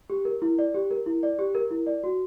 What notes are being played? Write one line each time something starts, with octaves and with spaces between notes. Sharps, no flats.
G4
A#4
E4
D5
G4
A#4
E4
D5
G4
A#4
E4
D5
F#4